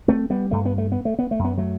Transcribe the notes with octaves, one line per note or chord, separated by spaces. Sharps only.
A3 C4
G3 B3
G2 A3
B3
A3
B3
A3
B3
A3
F#2
B3
F#3 A3